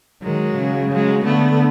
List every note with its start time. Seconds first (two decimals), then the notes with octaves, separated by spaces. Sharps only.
0.22 D#3 F#3 G#3
0.57 C#3
0.91 F#3 G#3
1.25 D3 A3 B3